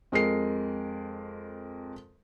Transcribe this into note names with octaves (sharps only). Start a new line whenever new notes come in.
F2 G#3 A#4 C7